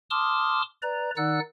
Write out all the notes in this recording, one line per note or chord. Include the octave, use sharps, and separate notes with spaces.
A5 C6 D6 D#6 F6
B4 D5 A#5
D#3 D#4 D5 F#5 E6 F#6